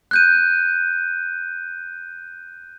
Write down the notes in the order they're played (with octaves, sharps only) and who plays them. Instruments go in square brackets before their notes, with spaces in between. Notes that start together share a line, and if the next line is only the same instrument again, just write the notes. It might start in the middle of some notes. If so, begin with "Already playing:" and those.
[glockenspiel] F#6 G6 D#7